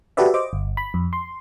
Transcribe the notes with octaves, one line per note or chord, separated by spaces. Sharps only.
F#4 G4 A4 B4 D5 E5
C5 D#5 D6
G1
B5
F2
C6